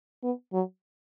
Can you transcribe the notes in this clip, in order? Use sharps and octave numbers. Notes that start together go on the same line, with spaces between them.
B3
F#3